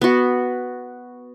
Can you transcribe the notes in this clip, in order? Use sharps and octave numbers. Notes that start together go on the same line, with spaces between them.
B3 F#4